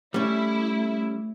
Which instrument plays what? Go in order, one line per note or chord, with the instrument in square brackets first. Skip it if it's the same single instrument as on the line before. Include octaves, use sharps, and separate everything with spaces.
[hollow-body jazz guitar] G3 C#4 [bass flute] A3 [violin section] E4